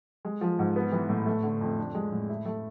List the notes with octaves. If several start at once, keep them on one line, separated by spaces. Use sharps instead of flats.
G#3
F3
G#2
B3
E3
A2
A3
D3
F2
D4
G#3
A2
E4
A3